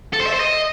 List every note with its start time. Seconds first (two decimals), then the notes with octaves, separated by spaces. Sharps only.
0.13 A4
0.20 C5
0.27 E5
0.33 C5
0.40 D#5